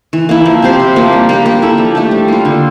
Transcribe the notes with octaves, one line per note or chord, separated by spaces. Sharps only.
E3
A#3 E4
F3
C4 G4 C5
C3
F3 A#3
G3
A#3 D4 G4
A#3
E4 A4
F3
A3 D4 G4
G3
A#3 F4
D3